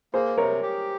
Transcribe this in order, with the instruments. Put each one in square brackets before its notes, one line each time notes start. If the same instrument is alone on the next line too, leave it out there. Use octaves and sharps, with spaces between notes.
[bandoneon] A#3 [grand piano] G#4 C5
[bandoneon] C3 [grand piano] A#4 C#5
[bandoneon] G4